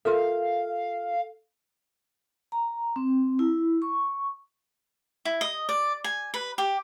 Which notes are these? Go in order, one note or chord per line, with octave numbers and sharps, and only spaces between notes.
F4 A4 A#4 E5 F5
A#5
C4
E4
C#6
E4
D#5
D5
G#5
B4
G4